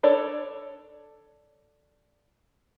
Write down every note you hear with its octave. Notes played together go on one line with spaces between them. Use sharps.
D4 A4 C#5 D5